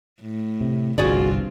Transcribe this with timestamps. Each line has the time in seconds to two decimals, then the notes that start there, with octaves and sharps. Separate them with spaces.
0.22 A2
0.61 C3
0.98 G1 C2 G2 C4 F4 F#4 G#4 D5